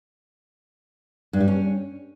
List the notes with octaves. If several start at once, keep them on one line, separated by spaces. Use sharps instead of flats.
G2
G3
C#4